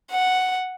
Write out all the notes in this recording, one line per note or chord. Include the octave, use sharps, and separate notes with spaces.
F#5